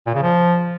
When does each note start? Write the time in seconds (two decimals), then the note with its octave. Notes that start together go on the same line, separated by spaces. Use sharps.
0.07 A#2
0.14 C#3
0.22 F3